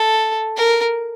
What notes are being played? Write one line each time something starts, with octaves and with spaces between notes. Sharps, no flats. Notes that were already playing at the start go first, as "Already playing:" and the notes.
Already playing: A4
A#4